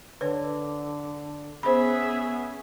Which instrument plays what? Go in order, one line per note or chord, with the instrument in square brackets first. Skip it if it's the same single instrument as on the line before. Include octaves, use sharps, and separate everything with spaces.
[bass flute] D3 [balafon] B4 C#5
[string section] B3 [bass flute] C#4 [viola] G#4 E5 [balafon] C5 B5